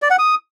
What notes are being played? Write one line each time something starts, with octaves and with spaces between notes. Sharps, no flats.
D5
F#5
D#6